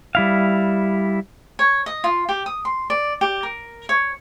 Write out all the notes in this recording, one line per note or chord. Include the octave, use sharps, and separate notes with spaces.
G3 E4 F5
C#5
D#5
F4
G4
D#6
C6
D5
G4
A#4
C#5